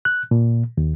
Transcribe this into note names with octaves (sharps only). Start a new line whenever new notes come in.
F#6
A#2
D#2